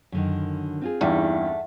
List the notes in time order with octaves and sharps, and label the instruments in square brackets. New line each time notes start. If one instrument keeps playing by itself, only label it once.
[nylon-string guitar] F#2 D3 D#3
C4 F4 G#4
[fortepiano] E2 G2 E3 [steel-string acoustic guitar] A3 [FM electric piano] D#4 E4 F#5